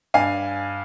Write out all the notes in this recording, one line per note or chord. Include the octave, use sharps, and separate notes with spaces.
G2 F5 G#5